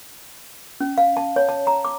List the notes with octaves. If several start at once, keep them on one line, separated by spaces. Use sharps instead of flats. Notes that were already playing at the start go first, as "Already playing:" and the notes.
C#4
F5
A5
C#5
A5
A#5
D6